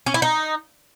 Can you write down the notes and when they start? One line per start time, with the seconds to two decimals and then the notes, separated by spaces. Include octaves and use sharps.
0.06 C#4
0.14 E4
0.22 D#4